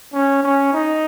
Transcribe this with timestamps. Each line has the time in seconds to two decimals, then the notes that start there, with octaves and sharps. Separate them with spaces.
0.13 C#4
0.43 C#4
0.73 D#4